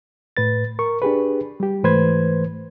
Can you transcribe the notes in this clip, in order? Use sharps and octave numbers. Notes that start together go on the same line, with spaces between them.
A2 B4 A6
A#4 C#6
D4 G4 G#4 B4
G3 G4
G#2 E3 A3 B4 C5 G#6